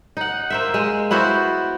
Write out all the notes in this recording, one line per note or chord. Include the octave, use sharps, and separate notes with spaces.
D#4 F#5
A#3 C5 E5
G#3
B3 E4 F#4 C5